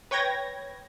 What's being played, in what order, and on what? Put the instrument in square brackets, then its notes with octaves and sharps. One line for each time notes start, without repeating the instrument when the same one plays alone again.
[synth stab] B4 C#5 G5 G#6 A#6